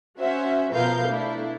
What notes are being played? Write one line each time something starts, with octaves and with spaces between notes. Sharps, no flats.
C#4 F#4 C5 E5 F#5
B2 F3 A#4 B4 F5 G6
A3 D4 E4